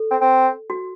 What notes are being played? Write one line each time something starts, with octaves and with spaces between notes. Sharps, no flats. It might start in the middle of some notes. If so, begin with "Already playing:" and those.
Already playing: A4
C4
C4
F#4